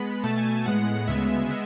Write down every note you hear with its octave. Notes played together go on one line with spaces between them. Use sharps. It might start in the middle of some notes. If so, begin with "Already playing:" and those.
Already playing: G#3 B3 B5
B2 A3 A5
G#5
G#5
A2 G#3 B3 F#5
D2 C#3 G#3 B3 E5
G#3 B3